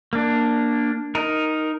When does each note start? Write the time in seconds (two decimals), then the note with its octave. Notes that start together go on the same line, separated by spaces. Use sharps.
0.13 A#3 D4
1.15 D#4 A#4